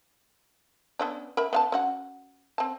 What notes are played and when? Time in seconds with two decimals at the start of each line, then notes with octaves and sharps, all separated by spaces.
0.99 B3 C#4 D4
1.37 A#4 E5 B5
1.53 B3 F5 A5
1.72 C#4 F#4 F#5
2.58 C4 A5